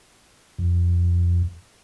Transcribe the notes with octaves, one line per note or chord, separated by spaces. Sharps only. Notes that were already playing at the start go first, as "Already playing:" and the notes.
F2